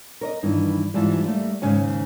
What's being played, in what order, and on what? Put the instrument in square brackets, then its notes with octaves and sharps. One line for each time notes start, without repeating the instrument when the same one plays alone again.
[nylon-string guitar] A#4 C#5 D#5
G2 D#3 E3
G#2 E3 G3 F4 A5
G3 A3 A#3
D#2 G#2 C#3 C#4 G#5